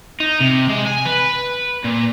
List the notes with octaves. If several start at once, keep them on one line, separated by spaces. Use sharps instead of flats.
D#4
C3
G#3
G#5
B4
A#2